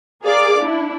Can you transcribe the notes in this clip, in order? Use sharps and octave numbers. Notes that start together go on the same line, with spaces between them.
G#4 A#4 D5 F5 D6
D4 E4